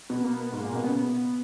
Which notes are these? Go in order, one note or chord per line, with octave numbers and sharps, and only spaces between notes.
B2 B3
A#3
B3
G#2
A#2 A#3
B2
C#3 B3